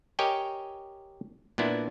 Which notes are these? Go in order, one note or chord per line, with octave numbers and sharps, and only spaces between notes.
G4 A#4 C#5 D#5 G5 G#5
A#2 B3 D4 E4